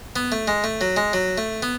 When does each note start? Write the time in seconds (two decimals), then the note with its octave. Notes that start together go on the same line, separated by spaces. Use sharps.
0.16 B3
0.32 A3
0.48 G#3
0.64 A3
0.81 F#3
0.96 G#3
1.13 F#3
1.38 A3
1.62 B3